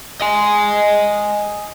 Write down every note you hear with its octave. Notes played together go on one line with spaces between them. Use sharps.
D#5 G#5